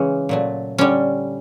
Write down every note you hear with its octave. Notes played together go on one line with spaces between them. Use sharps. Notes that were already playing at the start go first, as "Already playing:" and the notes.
Already playing: C#3 E3 G#3 C#4
A#2 F#3 A3
D3 G3 C#4